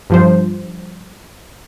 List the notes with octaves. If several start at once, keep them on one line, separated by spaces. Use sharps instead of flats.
G2 F3 C5